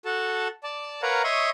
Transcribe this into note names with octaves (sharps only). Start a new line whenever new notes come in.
F#4 A4 A5
D5 A5
A#4 B4 C#5 F5 F#5 A#5
C#5 D#5 E5 C6 C#6 D#6